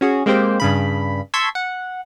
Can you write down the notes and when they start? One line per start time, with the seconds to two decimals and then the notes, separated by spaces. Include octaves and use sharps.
0.01 C#4 F#4 G#4
0.26 G#3 A#3 C4 G4 C5 G5
0.60 G2 C#3 B5
1.34 A5 C6 C#6 E6 G#6 B6
1.55 F#5